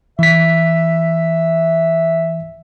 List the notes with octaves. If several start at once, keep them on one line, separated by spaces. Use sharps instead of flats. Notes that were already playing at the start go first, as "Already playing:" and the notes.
E3 E5 B6